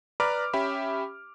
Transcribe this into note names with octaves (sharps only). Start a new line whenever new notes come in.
B4 D5 A#5 B5 D6 F6
C#4 G4 E5 B5